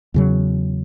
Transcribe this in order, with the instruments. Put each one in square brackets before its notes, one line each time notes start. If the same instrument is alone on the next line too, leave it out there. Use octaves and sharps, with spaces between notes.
[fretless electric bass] E2 C#3 F#3